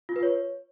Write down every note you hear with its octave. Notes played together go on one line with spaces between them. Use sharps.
F4
B4
C#5